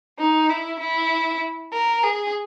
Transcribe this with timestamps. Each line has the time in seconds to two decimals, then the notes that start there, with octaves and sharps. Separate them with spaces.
0.18 D#4
0.49 E4
0.80 E4
1.72 A#4
2.03 G#4